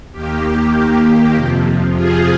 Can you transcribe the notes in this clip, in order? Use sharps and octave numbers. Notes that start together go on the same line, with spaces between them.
D#2 D#3 A#3 G4
F2 C3 F3
F4 G#4